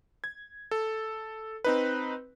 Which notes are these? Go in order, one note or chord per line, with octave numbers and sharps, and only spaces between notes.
G#6
A4
C4 D#4 B4